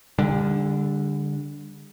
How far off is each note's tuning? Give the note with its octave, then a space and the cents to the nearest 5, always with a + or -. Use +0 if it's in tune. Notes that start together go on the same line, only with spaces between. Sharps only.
D3 -5 G3 +35